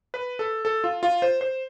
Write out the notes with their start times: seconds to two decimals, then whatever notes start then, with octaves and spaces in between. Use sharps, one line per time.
0.14 B4
0.39 A4
0.65 A4
0.84 F4
1.03 F4
1.22 C5
1.41 C5